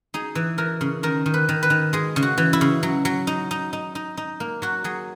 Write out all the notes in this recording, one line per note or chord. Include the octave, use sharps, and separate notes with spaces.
D#4 G#4
E3
E3 A#4
C#3
D#3 A#4
D#3
B4
D#3
B4
D#3
G#3 G#4
C#3
F#4
E3
E4
C#3
F#3
F#3
D#4
D#4
D#4
D#4
D#4
A#3
F#3 F#4
F#3 G#4